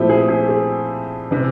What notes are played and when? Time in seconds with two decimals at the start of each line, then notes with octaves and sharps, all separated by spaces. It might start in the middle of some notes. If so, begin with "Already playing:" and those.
Already playing: A#2 F3 A3 C4 E4 G4
0.09 G#4
0.29 G#4
0.49 G#4
1.31 C3 E3